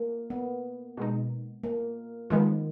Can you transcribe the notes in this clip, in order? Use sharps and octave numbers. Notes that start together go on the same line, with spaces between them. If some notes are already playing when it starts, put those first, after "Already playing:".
Already playing: A#3
B3
B2 G#3 D#4
A#3
D#3 F3 G#3 B3